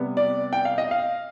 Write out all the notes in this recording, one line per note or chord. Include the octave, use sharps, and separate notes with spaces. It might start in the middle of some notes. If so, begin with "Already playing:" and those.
Already playing: C3 G3 B3
D5
G5
F5
D#5
F5